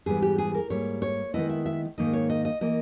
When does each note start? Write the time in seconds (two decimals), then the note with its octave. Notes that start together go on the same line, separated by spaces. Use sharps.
0.06 G#2 E3 G3 B3 G#4
0.22 G4
0.38 G#4
0.54 A#4
0.70 G#2 G3 A#3 C#5
1.02 C#5
1.34 D#3 G#3 B3 E4 D#5
1.49 E5
1.66 E5
1.98 G#2 D#3 A#3 D#4 D#5
2.13 C#5
2.30 D#5
2.45 D#5
2.61 E3 A#3 D#5